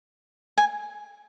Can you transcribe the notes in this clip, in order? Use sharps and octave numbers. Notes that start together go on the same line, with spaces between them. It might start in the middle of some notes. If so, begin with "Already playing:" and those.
G#5